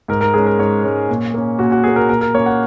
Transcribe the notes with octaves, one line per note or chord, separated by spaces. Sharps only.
G#2 A#4
A#4
G#3 C#4 G#4
A#4
G#2 C#5
G#3 C#4
A#2
A#3 C#4
A#2 F#4
F#4
A#3 C#4 G#4
A#4
A#2 A#4
A#4
A#3 C#4 C#5
F#5